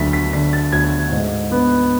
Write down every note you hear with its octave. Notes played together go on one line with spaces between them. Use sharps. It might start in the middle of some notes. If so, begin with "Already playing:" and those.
Already playing: D2 F#3 A6 B6
B6
D3 B6
A6
D2 G#6
G#2
B3